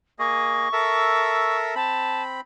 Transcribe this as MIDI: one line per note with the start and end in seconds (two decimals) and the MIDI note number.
0.19 0.68 58
0.19 0.68 68
0.19 0.68 75
0.19 1.56 85
0.73 1.75 69
0.73 1.75 70
0.73 1.75 76
1.75 2.41 60
1.75 2.22 81
1.75 2.41 83